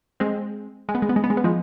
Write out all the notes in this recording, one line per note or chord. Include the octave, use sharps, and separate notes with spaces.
G#3 C4
G#3
B3
G#3
B3
G#3
B3
G#3
B3
F3 G#3